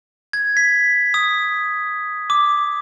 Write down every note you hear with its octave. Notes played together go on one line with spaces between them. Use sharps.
G#6
B6
D#6
D6